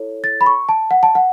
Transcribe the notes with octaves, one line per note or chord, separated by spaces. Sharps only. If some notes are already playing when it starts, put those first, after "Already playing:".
Already playing: E4 A4 C#5
A6
B5
C#6
A5
F#5
A5
F#5